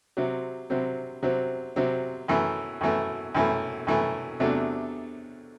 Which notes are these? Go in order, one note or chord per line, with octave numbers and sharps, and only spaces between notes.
C3 F#3 C4
C3 F#3 C4
C3 F#3 C4
C3 F#3 C4
F#2 E3 A3
F#2 E3 A3
F#2 E3 A3
F#2 E3 A3
E2 C3 F#3 A3 D4